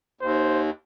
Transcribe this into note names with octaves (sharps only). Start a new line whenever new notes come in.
D#2 C5